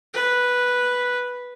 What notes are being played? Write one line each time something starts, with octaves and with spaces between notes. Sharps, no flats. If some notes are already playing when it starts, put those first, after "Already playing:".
B4